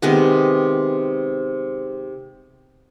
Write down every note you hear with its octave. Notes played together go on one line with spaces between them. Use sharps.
C3 D#3 G#3 B3